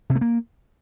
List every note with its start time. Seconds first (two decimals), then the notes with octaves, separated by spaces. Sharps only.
0.10 C3
0.15 A3
0.21 A#3